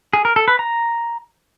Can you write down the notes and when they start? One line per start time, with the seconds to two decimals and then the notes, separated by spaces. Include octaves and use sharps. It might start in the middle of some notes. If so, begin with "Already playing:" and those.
0.13 G#4
0.25 A#4
0.36 A4
0.48 B4
0.59 A#5